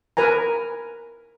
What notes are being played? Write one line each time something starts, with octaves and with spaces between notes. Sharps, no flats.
A#4 B4 G#5 A#5